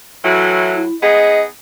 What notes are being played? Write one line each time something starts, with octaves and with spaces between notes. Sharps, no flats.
A2 E3 F#3
E4
B3 D#4 G#4 D#5